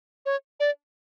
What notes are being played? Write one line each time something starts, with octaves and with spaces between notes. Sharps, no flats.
C#5
D5